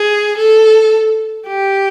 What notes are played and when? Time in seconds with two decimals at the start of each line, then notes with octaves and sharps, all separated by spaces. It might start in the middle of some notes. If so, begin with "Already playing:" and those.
Already playing: G#4
0.37 A4
1.48 G4